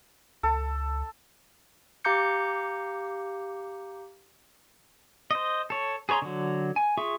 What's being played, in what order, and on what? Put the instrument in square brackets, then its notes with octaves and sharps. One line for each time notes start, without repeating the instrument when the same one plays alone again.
[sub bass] C#2 [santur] A4
[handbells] G4 F5 A#5 D6 G6 C#7
[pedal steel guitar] C5 D#5
A4 C#5
G#4 B4 C#5 A#5 C6
D3 F#3
G#5
F4 G#4 E5 C#6